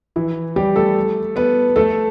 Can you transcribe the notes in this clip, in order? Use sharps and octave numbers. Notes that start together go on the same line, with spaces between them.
E3 E4
G3 G4
A3 A4
B3 B4
A3 A4